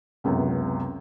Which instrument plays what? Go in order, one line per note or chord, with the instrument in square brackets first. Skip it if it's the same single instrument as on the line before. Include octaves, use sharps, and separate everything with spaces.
[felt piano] C#2 F#2 C3 B3